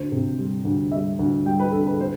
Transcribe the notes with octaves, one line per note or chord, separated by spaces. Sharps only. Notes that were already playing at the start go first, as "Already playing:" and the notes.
Already playing: D2 C5
C3
G3
D2
G3 E5
D2
G3 G5
B4
D2 A4
B4
C5